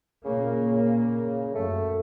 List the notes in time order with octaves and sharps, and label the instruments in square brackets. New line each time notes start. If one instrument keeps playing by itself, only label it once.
[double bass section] A#2 A#3 [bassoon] C#3
[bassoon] C#3
[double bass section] F#2 [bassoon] A3